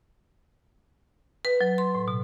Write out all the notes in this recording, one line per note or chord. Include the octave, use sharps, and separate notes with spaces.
B4
F#3
C6
A2
B2